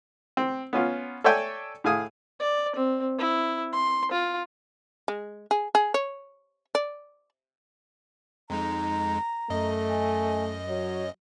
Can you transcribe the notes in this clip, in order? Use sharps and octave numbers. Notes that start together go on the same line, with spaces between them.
C4
B3 C#4 F4
A4 C#5 D5 E5 G5 G#5
A2 G#4 F5 G#5 D#6
D5
C4
E4
C6
F4
G#3
G#4
G#4
C#5
D5
F2 G#3 D#4 A#5
F#2 A3 D#5
G#5
F#3 C#5